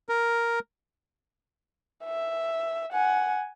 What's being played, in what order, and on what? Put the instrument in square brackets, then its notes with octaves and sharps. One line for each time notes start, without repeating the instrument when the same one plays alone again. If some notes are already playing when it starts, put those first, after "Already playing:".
[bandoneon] A#4
[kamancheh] E5
F#5 G#5